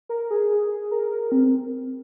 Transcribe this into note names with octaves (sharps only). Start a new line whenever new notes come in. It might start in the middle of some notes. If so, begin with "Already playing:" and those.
A#4
G#4
G#4
A#4
A#4
C4